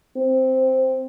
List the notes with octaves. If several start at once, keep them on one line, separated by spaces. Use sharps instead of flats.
C4